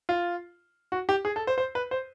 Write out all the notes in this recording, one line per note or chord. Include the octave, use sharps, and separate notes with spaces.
F4
F#4
G4
G#4
A4
C5
C5
B4
C5